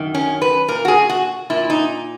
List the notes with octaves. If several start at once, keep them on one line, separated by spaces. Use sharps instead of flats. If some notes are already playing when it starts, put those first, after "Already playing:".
Already playing: F#2 D#3
C#4
B4
A#2 A#4
F#4
G#4
F#4
A#2 E4
D#4